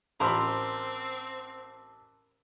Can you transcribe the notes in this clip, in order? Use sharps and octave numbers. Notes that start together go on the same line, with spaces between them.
A1 C4 A#4 C5 A5 B5 D6 E6